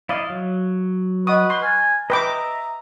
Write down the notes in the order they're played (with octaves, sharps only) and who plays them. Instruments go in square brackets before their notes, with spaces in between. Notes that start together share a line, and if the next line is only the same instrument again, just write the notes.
[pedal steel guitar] E4 D5 D#5 [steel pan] F5
[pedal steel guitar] F#3
[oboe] B4 [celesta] D#5 F#5 C#6 [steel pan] D#6
[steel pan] C6
[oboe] G#5 [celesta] F6 A6
[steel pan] B4 G5 D6 [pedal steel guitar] D#5 E5 [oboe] A#5